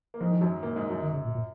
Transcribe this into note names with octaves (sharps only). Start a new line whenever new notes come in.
A#3
G#2 F3 G#3
D#3
F#2 F#3
A#2 A#3
G#2 G#3
F#2 F#3
D#3
C#3
A#2
A#2